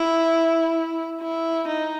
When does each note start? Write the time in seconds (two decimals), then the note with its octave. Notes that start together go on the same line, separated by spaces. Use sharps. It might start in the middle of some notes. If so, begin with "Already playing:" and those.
Already playing: E4
1.21 E4
1.67 D#4